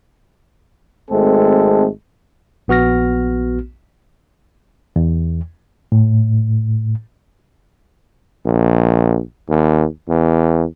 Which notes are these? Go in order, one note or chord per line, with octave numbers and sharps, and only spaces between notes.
G#1 G#3 A3 C4 A4
A#1 B3 F#4 F6 A#6
E2
A2
A#1
D#2
E2